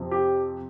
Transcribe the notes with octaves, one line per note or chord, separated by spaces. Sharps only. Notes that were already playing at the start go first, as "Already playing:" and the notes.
Already playing: F2 C3 F3
G4